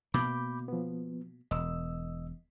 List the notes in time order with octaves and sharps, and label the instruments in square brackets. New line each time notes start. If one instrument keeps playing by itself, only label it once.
[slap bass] B2 A#3 [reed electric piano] B5 D6 G6
[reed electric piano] F3 B3
[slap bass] E1 [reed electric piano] D#5 E6